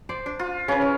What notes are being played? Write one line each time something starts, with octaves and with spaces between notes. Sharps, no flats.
C5 D5
D4
F4
C#3 C#4 B4
E4